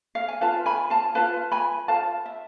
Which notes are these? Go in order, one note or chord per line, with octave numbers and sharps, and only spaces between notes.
F5
G#5
F4 B4 F5 A5
G#5 B5
F5 A5
F4 B4 F5 A5
G#5 B5
F4 B4 F5 A5
E5